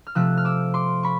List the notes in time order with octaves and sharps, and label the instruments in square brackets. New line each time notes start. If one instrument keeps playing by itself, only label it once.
[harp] F6
C3 F3 A3 E6 F#6
F6
D6 E6
C6 D6
B5 C#6